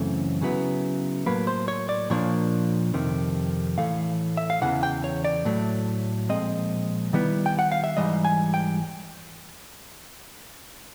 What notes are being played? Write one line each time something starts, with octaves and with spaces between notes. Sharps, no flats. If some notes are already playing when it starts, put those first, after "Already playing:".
Already playing: F#2 C#3 E3 A3 C4 C#5
C#3 F#3 B3 E4
A2 F#3 A#3 B4
C5
C#5
D5
A#2 F3 A#3 D4 C#5
F2 C3 D#3
A2 E3 A3 F5
E5
F5
E2 C#3 E3 F#5
G5
C#5
D5
A2 F#3 A3
A#2 F3 G#3 C4 D#5
D#3 G3 B3 E4
G5
F#5
F5
E5
G#2 E3 G3 D#5
G#5
G5